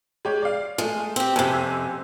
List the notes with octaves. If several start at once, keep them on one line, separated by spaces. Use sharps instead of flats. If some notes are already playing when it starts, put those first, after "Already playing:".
G#3 G4 C#5
D5 F5
G#3 A3 F4
C4 G4
F#1 F2 C3 G#5 E6